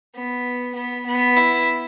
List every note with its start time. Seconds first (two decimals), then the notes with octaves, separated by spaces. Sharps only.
0.15 B3
0.75 B3
1.06 B3
1.37 E4